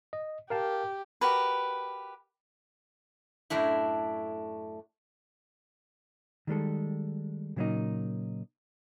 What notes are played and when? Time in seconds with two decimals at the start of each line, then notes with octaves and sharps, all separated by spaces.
0.13 D#5
0.50 G4 A#4 F5 A5
1.21 F#4 G4 A#4 B4
3.50 F#2 A2 A3 D4 E4
6.47 D#3 G3 G#3 A4
7.56 A#2 C#3 F#3 A3 A#3 D#4